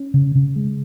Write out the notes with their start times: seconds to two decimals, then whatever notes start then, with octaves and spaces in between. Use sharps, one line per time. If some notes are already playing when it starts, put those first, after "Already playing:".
Already playing: C#4
0.14 C#3
0.35 C#3
0.56 G#3